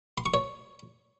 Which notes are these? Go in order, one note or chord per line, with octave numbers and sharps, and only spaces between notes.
C6
C#6
C#5